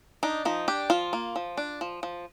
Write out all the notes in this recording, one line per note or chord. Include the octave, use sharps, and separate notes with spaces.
D4 D#4
F3 D#4
D4 G4
F3 F4
A#3
F3
D4
F3
F3